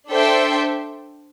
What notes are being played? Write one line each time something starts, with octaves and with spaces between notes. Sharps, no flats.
D4 A4 C5 E5 G5